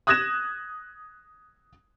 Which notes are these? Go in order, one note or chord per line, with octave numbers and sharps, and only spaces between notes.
D#6 F#6 G#6 A#6 E7